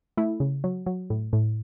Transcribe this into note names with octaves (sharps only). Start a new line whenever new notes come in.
A3 E4
C#3
F#3
F#3
A2
A2